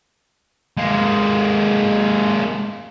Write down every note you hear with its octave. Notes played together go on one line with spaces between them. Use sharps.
G#3 A#3